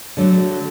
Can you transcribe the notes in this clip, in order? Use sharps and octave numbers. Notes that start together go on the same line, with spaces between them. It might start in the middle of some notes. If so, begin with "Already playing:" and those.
D3 F#3 A3